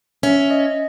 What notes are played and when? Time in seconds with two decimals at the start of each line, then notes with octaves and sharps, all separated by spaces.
0.23 C#4 E5
0.50 D#5